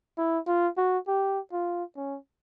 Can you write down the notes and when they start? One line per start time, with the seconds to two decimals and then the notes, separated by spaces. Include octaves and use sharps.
0.18 E4
0.47 F4
0.77 F#4
1.08 G4
1.52 F4
1.96 C#4